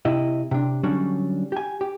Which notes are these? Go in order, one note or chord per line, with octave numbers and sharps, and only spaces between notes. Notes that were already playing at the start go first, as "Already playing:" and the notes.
C3 E4 D#5
C3 D4
D3 F#3 G3 C#4 D4
G4 G#5
G4